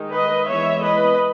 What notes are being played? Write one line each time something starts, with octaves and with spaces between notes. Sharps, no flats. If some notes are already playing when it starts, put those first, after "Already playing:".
Already playing: D#3 G#3 D#4
B4 D#5
E3 G#3 B3 C#5 E5
B4 D#5